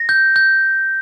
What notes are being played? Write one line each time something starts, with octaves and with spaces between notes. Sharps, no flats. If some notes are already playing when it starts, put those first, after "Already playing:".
Already playing: A#6
G6
G6